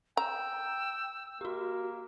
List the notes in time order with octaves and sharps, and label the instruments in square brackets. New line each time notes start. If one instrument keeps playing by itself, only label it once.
[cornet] G5 [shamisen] A#5 [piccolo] E6
[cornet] A#3 [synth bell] F#4 G4